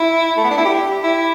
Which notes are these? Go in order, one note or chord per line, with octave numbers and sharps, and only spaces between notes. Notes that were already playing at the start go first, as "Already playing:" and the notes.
Already playing: E4
A3
B3
D4
E4
G4
E4